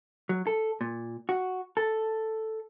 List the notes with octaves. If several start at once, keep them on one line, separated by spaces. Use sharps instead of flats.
F#3
A4
A#2
F#4
A4